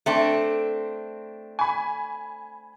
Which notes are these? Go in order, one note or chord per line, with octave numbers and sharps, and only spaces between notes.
A3 C4 D4
G#5 B5